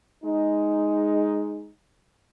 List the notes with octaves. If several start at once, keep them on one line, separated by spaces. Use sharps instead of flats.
G#3 D#4